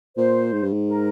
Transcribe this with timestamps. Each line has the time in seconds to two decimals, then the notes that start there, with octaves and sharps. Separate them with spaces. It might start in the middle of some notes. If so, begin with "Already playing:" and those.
0.17 A#2 C5
0.53 G#2
0.63 G2
0.73 G#2
0.89 A#4